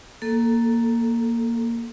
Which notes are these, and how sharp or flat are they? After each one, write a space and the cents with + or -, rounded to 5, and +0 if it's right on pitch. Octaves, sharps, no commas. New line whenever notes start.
A#3 +0 A4 +0